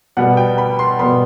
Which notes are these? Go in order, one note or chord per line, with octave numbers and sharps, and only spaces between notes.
B2 G3 B3 F#5
G5
B5
C6
B2 G3 B3 B5